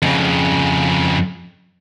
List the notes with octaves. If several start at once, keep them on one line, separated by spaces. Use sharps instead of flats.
F2 C#3